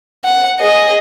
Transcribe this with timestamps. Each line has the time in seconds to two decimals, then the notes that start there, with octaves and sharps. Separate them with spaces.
0.24 F#5
0.60 G#4 D#5